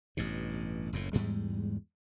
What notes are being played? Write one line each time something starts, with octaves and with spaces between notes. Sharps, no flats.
A1 G2 B2
F#1 F#2 A2
E2 G#2 G3 G#3